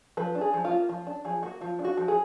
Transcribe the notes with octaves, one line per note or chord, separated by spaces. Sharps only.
F3 B4
D4
G#4
F3
F4
A#3
F3 F4
D4
F3 G#4
A#3 F#4
F3 F4
D4
F#4
F3
G#4